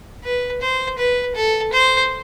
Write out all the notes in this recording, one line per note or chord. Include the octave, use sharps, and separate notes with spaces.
B4
C5
B4
A4
C5